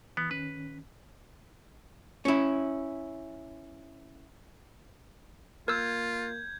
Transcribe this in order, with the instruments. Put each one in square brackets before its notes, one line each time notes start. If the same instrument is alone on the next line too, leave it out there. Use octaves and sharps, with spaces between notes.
[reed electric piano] E3 [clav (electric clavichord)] B3
[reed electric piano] D#3 C#4 [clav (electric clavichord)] B4
[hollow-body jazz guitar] C#4 E4
[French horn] A#3 [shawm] F4 [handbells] A#4 E6 [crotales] G6 G#6